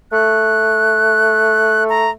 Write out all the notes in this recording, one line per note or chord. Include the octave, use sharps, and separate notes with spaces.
A3 F#6
A#5